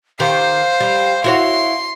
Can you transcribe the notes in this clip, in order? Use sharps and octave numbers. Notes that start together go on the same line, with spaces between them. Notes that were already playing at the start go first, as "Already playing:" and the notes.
D#3 G4 C5 F5
G3
E4 F#4 C#5 C6